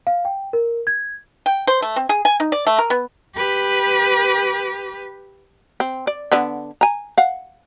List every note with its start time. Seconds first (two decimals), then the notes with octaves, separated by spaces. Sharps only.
0.07 F5
0.25 G5
0.53 A#4
0.87 G#6
1.46 G5
1.67 C5
1.82 A3
1.96 C4
2.09 G#4
2.25 G#5
2.40 D#4
2.52 D5
2.67 A3
2.78 A#4
2.90 B3
3.35 G4 B4
5.80 C4
6.07 D5
6.32 D3 B3 D4
6.81 G#5 A#5
7.18 F5 F#5